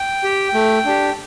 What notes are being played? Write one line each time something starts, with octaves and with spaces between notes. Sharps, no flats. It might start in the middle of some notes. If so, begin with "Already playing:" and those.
Already playing: G5
G4
A3
D4 G4